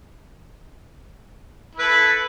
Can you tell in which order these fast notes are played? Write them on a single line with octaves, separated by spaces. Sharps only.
E4 B4 A4